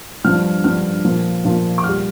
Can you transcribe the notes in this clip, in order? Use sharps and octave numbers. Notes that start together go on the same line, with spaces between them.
G2 F3 F6
G2 F3 F6
A#2 F3
A#2 F3
D6
A#2 G3 F6